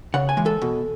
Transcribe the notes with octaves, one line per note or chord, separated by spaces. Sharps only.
C#3 F#5
G#5
E3 G#3
A4
B2